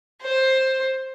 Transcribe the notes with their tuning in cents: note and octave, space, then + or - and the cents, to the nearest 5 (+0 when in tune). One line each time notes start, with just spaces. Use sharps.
C5 +10